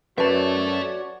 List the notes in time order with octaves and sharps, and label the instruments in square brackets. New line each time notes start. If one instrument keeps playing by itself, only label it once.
[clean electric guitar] F#2 [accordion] F#4 C#5 D5 [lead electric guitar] A4 E5 [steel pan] B4 A5